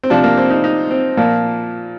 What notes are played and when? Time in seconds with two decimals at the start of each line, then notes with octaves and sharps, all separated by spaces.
0.04 C4
0.10 C3 F3 D4
0.24 A#3
0.38 C4
0.50 D#4
0.64 D#4
0.91 C4
1.17 A#2 F3 A#3